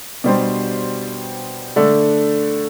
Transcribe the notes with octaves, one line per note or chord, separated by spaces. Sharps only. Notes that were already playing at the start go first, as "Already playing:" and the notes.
B2 G3 D4 G4 C5
D3 A3 D4